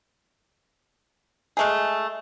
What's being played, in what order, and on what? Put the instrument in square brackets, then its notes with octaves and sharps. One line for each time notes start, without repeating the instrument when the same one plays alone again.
[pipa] G#3 A3 G#4